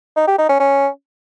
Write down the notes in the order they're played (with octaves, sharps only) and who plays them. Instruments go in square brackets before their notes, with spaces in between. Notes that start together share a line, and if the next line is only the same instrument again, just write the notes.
[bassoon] D#4
G4
D#4
C#4
C#4